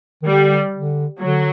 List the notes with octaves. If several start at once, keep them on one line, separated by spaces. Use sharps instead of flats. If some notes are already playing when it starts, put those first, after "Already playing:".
D#3
D3 G3
D3
D3 F#3